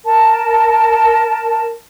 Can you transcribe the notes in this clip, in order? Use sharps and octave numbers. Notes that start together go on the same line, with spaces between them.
A#4 A5